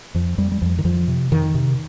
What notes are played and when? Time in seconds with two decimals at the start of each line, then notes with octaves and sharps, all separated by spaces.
0.15 F2 F3
0.38 F2 G3
0.52 G3
0.62 F2 F3
0.79 D#3
0.85 F2 F3
1.08 C3
1.31 F2 D#3
1.55 C3